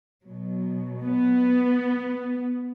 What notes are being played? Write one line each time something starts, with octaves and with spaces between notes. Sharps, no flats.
B2 F#3
B3